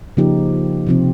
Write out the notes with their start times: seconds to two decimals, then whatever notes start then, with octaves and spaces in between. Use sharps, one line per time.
0.17 C#3 F3 A#3 D#4 G4
0.87 C3 F3 C4